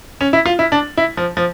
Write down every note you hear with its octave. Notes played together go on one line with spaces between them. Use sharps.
C#4
E4
F4
E4
D4
E4
F3
F3